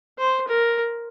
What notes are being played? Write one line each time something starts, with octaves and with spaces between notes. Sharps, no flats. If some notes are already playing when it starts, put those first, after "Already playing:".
C5
A#4